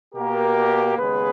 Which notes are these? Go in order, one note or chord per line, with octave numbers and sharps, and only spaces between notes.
B2 A#3 G4 A#4
D#2 C#3 G#3 B3 G#4 B4